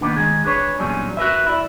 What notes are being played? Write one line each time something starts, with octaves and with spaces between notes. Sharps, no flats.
D#3 A#3 B3 D4
D#3 G#3 G#4
D4 G#4 B4 C#5
E2 A#2 F#3 G3 C#4 D4
F#4 A#4 B4 E5
E4 D5